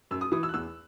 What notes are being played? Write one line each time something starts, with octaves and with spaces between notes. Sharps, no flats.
F#2 E6
D#6
E3 D#6
E6
F#6
E2 E6